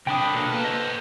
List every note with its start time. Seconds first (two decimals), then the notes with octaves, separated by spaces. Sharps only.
0.07 C2 D4 G5 B5 D#6
0.34 B2 A#3 A4 B4
0.52 A#3 A5
0.65 C5 D#5